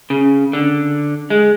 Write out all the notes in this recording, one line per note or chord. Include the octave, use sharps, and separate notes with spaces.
C#3
D3
G#3